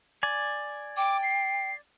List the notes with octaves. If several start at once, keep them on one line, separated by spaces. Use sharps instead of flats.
D5 G#5
G5 D6
C7